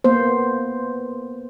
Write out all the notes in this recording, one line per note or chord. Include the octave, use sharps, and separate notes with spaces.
A#3 B3 C5